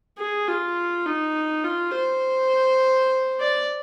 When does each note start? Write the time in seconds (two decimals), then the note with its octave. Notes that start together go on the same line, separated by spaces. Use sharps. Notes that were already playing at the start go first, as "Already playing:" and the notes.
0.18 G#4
0.48 F4
1.06 D#4
1.64 F4
1.94 C5
3.40 D5